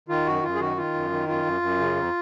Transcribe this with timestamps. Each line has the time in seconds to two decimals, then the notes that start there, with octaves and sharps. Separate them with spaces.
0.09 D#3 F4
0.26 F#2 F#4
0.43 F#2 F4
0.55 G#4
0.60 D#3 F#4
0.77 D#3 F4
0.94 F#2
1.11 D#3
1.28 F#2 F4
1.45 F#2
1.61 F#2
1.79 C#3
1.96 F2